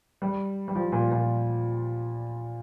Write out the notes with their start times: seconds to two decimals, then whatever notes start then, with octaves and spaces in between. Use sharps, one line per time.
0.22 G3
0.68 G3
0.75 F3
0.92 A#2
1.11 A#2